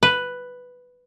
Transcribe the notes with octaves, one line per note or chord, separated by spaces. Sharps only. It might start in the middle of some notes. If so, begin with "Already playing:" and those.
B4